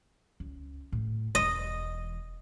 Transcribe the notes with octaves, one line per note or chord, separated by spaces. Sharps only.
C#2
A2
E1 E3 D#5